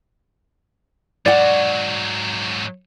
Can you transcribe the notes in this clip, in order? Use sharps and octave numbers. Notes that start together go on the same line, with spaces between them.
G#2 F#3 D5 F#5